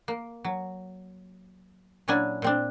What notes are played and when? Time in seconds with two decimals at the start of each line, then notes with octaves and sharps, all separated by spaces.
0.08 A#3
0.44 F#3
2.08 A#2 F#3 C#4 D4 E4 G#5
2.42 A#2 C4 D4